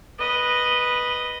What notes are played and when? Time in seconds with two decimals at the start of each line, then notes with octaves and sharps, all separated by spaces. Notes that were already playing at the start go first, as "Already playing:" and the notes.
0.19 B4 D#5